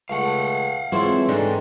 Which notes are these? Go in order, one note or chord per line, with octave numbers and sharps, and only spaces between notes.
C#2 A3 F5 F#5
E3 G#3 C4 C#4 E4 F4 A4 C5
G#2 D4 D#4 A4 G5 G#5